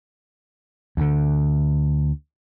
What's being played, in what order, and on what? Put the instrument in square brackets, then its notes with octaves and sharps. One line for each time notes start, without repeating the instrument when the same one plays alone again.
[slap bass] D2 D3